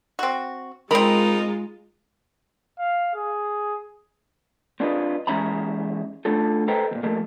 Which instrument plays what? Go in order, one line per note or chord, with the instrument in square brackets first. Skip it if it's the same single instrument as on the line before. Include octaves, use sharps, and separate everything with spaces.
[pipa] C4 F#4
[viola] G#3 F4 [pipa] C4 B5 [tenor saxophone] D#4 [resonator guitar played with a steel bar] A#4
[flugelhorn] F5
G#4
[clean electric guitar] C4 D4 F4 B4 D#5
E3 G#3 C#4 E5 A#5 B5
A3 D4 F4 A4
A4 B4 C5 D#5 G5 A#5
E2 A#2
F3 A3 A#3